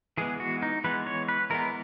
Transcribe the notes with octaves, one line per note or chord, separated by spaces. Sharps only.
E3 G#3 B3 G#4
F#4
D#4
E3 G#3 B3 B4
C#5
B4
E3 G#3 B3 A#4